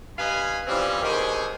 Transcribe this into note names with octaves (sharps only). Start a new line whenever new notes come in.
G2 B4 D#5 F5 G#5 B5
E3 F3 G3 C4 C#4
B2 D#3 C4 G4 G#4